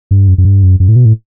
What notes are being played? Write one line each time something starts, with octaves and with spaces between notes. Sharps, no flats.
G2
F#2
F#2
G2
F#2
F#2
A2
B2
A2